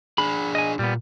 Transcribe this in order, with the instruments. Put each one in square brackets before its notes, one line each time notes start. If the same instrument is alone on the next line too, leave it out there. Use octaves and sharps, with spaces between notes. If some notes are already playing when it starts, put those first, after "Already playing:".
[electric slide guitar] D4 G#4 [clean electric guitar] B5
[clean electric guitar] D#5 G#5
[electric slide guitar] A#2 [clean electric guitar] G3 B3